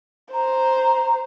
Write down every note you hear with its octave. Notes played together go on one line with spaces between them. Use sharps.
C5 A#5